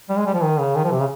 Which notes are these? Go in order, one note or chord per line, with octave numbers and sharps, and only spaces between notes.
G3
G#3
G3
F3
D#3
C#3
D#3
F3
C3
C#3